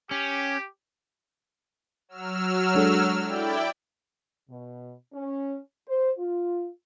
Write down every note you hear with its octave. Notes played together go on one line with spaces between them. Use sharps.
C#4 G4
F#3 E6 F6
G#3 D4 A4
E4 D5 G5
B2
C#4
C5
F4